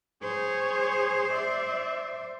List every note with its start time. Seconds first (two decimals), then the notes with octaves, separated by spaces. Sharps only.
0.23 G#4 C5 C#5
1.33 D5 E5